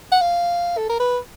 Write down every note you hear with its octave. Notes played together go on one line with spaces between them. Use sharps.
F#5
F5
A4
A#4
B4